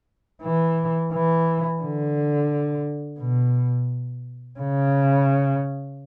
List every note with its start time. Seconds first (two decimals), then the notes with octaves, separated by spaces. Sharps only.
0.42 E3
1.13 E3
1.82 D3
3.20 B2
4.59 C#3